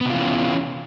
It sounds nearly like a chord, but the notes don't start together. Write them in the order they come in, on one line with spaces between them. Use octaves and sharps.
B3 C3 F4 E3 C#4